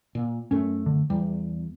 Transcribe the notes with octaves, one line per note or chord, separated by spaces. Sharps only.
A#2
F#2 A3 C#4
D3
E2 G3